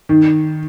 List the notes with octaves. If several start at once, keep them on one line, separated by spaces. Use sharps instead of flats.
D#3